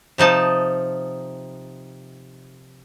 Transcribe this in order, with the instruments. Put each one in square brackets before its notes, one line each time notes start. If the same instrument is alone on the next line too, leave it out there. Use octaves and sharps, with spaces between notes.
[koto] C3 F3 D#4 A5